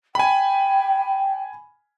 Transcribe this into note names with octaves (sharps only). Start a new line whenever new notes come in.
G5 G#5 B5